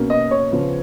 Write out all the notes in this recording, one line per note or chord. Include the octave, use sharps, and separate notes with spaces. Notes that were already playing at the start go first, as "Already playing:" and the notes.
Already playing: B2 A#3 C#4
D#5
C#5
C#3 F3 B3